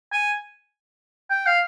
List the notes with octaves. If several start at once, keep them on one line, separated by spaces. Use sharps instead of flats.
G#5
G5
F5